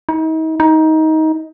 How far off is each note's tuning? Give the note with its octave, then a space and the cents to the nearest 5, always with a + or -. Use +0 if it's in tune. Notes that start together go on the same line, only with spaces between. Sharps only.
D#4 +40
D#4 +20